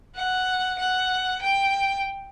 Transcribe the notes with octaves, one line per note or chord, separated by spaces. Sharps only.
F#5
F#5
G5